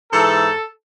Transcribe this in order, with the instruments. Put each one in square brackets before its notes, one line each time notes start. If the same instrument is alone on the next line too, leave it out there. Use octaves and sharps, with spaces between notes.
[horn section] G#2 E3 A4